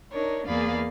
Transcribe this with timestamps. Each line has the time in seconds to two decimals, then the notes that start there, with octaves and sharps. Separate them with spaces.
0.12 D4 D#4 A#4 C#5
0.47 E2 A#3 G#4 D5 F5 B5